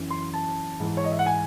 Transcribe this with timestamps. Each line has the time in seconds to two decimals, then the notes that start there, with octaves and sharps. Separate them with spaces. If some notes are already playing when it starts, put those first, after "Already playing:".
Already playing: F#2 E3
0.10 C6
0.34 A5
0.80 G#2 E3
0.97 C#5
1.04 D#5
1.12 E5
1.19 F#5
1.26 G#5